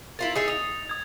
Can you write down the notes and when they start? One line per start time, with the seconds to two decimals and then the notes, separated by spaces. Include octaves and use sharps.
0.19 E4 F4 A#4 A6
0.35 D#4 G#4 E5 D#6
0.48 D#4 D#6 F7
0.89 D#6 G#6